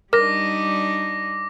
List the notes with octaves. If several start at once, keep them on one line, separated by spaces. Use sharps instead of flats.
G3 D4 D#4 A#4 D6 A#6